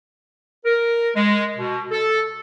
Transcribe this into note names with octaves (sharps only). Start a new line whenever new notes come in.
A#4
G#3
B2
A4